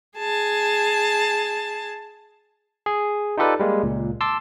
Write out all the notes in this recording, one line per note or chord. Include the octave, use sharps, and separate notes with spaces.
G#4 A5
G#4
D#4 F4 G4 A4 B4 D5
G3 G#3 A#3
C#2 A#2
A5 C6 D6 E6